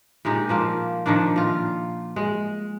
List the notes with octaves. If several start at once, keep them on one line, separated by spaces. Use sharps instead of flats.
A#2 G#3 D#4 G4
F3 A#3 F4
D#3 F3 A#3 D4
A#2 F4
G#3